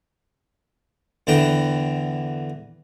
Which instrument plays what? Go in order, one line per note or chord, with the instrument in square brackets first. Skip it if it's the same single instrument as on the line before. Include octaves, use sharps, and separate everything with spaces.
[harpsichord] E2 D3 E3 G5 A#5